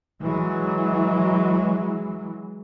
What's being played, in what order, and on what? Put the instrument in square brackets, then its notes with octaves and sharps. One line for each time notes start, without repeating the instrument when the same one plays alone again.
[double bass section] E3 F#3 G#3